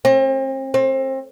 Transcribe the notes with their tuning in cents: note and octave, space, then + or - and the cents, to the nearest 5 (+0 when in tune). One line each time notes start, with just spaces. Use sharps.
C4 +40
C4 +30